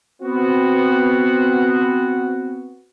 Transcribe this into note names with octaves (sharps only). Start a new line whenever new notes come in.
B3 C4 F#4